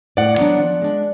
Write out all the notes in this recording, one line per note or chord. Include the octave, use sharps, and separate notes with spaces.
A2 D5 F#5
F#3 B3 D4
F3
G#3 D4